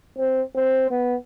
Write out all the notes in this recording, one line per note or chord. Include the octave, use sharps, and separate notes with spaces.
C4
C4
B3